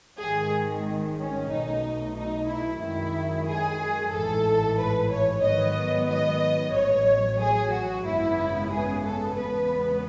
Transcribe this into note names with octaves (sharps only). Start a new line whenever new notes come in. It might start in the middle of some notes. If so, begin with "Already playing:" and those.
G#1 G#2 D#3 G#3 G#4
C#4
B1 B2 A3 D#4
D#4
E4
F#2 D#3 G#3 E4
G#4
A1 G#2 E3 A4
B4
C#5
G#2 D#3 F#3 B3 D#5
D#5
A1 A2 F#3 C#5
G#4
F#4
G#1 F#2 C#3 G#3 B3 E4
G#4
A4
E2 C#3 G#3 B3 B4